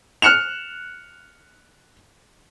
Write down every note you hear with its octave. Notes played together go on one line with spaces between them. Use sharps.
F6 F#6 C#7 E7 F7